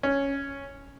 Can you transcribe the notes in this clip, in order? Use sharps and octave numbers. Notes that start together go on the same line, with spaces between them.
C#4